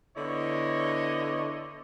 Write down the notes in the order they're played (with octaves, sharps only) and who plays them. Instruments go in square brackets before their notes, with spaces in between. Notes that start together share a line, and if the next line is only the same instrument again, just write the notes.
[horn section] D3 B3 E4 C#5 D#5